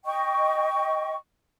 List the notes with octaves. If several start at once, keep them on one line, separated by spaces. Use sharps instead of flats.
D#5 G5 C#6